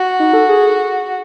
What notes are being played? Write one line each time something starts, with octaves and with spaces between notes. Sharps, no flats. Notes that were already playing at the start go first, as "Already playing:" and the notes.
Already playing: F#4
D#4
A4
G#4